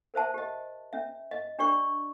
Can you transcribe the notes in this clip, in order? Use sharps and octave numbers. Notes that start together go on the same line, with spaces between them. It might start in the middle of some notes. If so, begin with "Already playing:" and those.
A#4 C5 E5 A5
G4 D#5
C#4 E5
D#5
D4 G4 D5 C#6